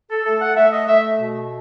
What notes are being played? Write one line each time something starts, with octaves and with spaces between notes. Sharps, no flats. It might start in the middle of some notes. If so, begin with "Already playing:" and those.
A4
A3 A4
F#5
A3 E5
D#5
A3 E5
B2